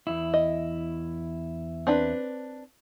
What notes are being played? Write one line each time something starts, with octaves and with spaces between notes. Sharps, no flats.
E2 E4
D#5
C4 D4 B4